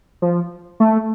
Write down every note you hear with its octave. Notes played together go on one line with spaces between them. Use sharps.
F3
A3